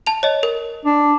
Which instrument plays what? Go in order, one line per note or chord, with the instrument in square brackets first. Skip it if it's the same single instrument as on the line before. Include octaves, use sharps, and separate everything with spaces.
[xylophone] A5 F7
C#5 D#5
A#4
[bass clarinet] D4